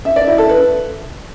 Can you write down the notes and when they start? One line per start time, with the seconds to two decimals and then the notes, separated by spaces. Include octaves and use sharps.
0.05 E5
0.16 D5
0.27 E4
0.38 A4
0.49 B4